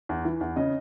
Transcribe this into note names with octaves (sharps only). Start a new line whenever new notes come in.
E2
E3
E2
C#3 D#5